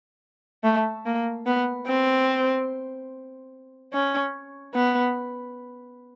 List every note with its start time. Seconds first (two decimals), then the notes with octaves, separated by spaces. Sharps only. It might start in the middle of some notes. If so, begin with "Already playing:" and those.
0.64 A3
1.06 A#3
1.46 B3
1.87 C4
3.93 C#4
4.75 B3